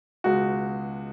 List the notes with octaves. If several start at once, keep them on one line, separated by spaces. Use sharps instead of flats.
C#2 B2 G#3 F#4